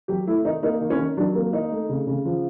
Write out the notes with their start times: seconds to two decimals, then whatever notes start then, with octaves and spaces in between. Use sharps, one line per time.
0.08 F#3 G4
0.27 A3 E4
0.45 D#3 D#4
0.63 A#3 D#4
0.81 D#3
0.90 C#4
0.99 D#3
1.17 F#3 D4
1.35 A#3
1.53 D#3 D#4
1.72 A3
1.89 C#3
2.07 C#3
2.25 F3